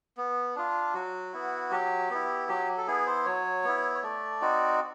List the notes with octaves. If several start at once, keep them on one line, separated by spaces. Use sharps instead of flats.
B3
D4 F4
F#3 F#4
B3 E4
F#3 G4
B3 E4
F#3 G4
A4
B3 E4 G#4
C5
F#3 C#5
B3 E4
C#5
A3 D5
C4 D#4 F#4